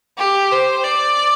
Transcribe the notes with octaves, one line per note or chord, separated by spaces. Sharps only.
G4
C5
D5